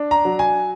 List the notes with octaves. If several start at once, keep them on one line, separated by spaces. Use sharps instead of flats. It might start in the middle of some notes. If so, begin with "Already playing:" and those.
Already playing: D4
A#5
F#3
G#5